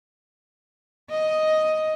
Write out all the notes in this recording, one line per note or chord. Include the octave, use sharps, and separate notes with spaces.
D#5